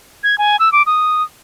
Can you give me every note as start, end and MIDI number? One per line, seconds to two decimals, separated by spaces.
0.24 0.38 92
0.38 0.57 80
0.59 0.72 88
0.72 0.82 86
0.86 1.23 87